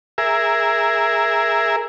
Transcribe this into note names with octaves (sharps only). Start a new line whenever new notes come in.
G#4 A#4 E5